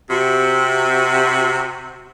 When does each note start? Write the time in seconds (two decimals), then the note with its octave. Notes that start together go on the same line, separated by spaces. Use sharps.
0.10 C3 F#4